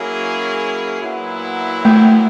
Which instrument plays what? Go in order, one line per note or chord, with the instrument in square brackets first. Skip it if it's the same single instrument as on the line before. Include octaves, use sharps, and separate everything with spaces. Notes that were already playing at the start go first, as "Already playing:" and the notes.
Already playing: [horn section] F#3 A#3 C#4 E4 G#4
A#2 F#3 B3 E4
[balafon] A3